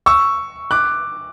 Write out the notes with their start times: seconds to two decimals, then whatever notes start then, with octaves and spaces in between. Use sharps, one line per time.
0.06 C#6 E6
0.71 D6 F#6